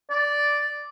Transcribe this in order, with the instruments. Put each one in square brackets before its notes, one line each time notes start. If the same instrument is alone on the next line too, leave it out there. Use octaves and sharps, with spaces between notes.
[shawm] D5